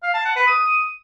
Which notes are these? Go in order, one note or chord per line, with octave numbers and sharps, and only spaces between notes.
F5
A5
F#5
B4
D#6